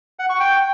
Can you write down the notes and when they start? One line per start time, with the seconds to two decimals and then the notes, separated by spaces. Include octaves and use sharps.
0.19 F#5
0.30 C#6
0.40 G5